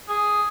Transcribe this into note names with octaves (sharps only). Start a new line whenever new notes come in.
G#4